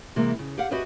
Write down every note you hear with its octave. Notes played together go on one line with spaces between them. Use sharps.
C3 E3 G#3 A#3
C#3
G4 F5 F#5
F#4 G4 B4 D#5 E5 G#5